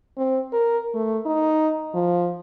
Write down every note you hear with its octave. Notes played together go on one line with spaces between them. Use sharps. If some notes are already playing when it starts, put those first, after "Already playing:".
C4
A#4
A3
D#4
F3